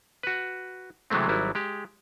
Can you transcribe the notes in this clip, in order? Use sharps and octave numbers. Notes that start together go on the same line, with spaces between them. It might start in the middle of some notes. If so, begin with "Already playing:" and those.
F#4 B4
C3 E3 F#3 G#3 A3 C4
G#1 F#3 G3 E4
G#3 G4